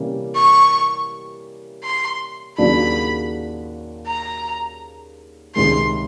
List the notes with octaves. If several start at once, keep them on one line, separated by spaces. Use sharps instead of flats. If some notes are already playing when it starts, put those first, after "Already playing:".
Already playing: C3 E3 G3 A#3 C#4
C#6
C6
D#2 C#3 F#3 A#3 D4 B5
A#5
C#2 C3 D#3 G#3 C6